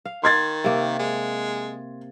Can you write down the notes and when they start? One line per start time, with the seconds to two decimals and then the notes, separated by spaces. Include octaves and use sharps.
0.05 F5
0.24 D#3 C6 G#6 A6
0.64 C3 A#3
0.99 G#3